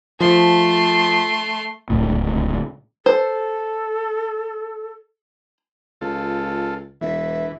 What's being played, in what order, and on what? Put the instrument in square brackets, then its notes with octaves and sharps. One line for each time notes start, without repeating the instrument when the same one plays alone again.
[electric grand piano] F3 [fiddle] A3 C6
[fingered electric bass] D1 C#2 A2
[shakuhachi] A4 [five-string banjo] C5
[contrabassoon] C#2 [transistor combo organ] F4 A4
[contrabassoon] E1 [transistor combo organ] E3 [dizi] E5